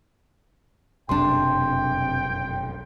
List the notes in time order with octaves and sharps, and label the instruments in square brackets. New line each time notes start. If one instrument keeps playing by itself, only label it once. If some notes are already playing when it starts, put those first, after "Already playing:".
[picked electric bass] F1 B1 F#2 [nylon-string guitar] C3 D4 [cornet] G5 [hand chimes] C6